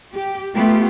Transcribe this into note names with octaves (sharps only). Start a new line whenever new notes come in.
G4
A3 B3 F4 G4